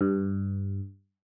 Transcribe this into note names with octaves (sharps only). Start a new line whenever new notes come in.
G2